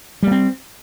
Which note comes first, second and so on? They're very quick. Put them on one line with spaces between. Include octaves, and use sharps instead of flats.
G3 A#3 C4